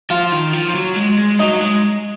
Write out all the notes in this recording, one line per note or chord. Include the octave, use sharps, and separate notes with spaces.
F3 F4
D#3
F3
F3
F#3
G#3
G#3
F#3 D#4
G#3